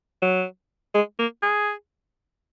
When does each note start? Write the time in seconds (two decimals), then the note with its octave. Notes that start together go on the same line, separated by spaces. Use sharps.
0.22 F#3
0.94 G#3
1.19 A#3
1.43 G#4